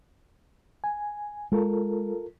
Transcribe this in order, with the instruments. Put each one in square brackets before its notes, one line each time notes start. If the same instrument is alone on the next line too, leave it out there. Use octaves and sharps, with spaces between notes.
[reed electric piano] G#5
[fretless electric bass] G#3 [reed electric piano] F4 A4 A#4